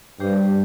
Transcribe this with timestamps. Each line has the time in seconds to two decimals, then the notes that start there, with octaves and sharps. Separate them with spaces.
0.20 G2 G3 D4 G4 C5